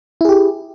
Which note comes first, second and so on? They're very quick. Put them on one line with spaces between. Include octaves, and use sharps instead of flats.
E4 G#4 G4